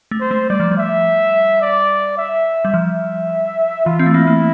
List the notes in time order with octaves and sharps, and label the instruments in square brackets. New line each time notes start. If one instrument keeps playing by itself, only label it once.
[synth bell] A3
[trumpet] C5
[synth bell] A3
[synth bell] G3 [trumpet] D5
[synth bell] F3
G3
[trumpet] E5
D5
E5
[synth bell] G3
[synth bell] F3 [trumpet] E5
[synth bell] E3 [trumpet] F4
[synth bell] C4
A3
[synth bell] A#3 [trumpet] E4
[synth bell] A#3